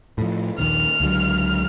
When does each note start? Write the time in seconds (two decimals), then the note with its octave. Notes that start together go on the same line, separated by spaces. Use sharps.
0.18 A2 F3
0.58 A#1 D#2 D#3 F6
1.00 C#2 D3 F#3